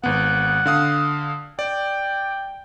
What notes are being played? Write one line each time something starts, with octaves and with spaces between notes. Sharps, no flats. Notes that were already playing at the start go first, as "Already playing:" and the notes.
G#1 B3 F#5
D3 F5 D#6
D5 G5